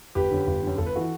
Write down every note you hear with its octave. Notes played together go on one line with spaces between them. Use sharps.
G1 G4 B4
F#2 D3
G1
F#2 D3
G1 A4
B4
E3 F#4 A4